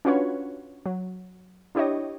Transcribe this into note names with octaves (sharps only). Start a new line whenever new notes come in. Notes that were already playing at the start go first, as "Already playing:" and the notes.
C#4 D4 F4 F#4 B4 C#5
F#3
D4 E4 G4 C#5 D#5